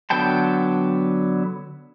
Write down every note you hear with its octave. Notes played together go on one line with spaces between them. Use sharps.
D3 F#3 B3 G5 A5